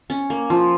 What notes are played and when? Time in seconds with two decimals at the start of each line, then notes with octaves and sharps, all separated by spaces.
0.10 C#4
0.30 A#3
0.50 F3